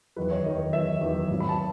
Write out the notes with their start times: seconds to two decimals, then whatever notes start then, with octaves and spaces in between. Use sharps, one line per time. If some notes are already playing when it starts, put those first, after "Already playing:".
0.16 E2 D#3 F#3 B4
0.31 C#5
0.44 E2 D#3 F#3 D#5
0.73 E2 D#3 F#3 E5
1.01 E2 D#3 F#3
1.30 G#1 G#2 F#3
1.40 B5
1.49 A5